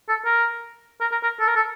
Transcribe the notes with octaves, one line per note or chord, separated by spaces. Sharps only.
A4
A#4
A#4
A#4
A#4
A4
A#4
A4